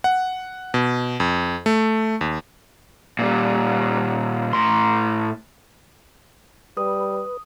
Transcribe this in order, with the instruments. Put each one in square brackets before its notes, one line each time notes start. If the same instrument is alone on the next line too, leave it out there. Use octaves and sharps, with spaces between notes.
[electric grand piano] F#5
B2
F2
A3
D#2
[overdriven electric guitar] A#2 G3
A2 C6
[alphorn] G3 [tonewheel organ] B4 [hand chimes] D#6